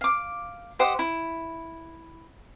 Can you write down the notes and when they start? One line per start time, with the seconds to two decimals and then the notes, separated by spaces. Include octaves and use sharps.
0.01 F5 D6
0.79 G4 C5 D#5 F#5
0.99 E4